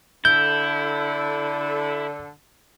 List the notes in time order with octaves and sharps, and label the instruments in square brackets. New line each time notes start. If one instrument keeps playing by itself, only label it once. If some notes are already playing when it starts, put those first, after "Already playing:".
[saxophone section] D3 A4 [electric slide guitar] E4 [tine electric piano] G6